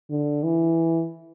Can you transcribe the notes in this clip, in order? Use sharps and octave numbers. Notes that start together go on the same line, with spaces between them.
D3
E3